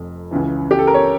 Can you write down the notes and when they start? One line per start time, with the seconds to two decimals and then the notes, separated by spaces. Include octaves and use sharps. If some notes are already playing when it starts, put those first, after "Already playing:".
Already playing: F1 F2
0.31 C#2 C#3 E3
0.71 G4
0.79 A4
0.87 A#4
0.94 C#5